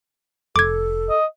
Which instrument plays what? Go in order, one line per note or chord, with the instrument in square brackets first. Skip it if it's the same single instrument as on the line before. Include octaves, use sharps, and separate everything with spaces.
[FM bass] F1 [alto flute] A4 [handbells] D6 G#6
[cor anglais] D#5